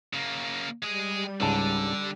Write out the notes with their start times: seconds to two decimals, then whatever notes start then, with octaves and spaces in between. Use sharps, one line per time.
0.13 C#3 A#3
0.83 G3 G#3 G#4
1.40 C#2 G#2 D3 A5